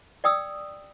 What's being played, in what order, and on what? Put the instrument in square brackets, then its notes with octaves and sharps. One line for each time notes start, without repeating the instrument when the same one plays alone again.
[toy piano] D5 G5 D#6 E6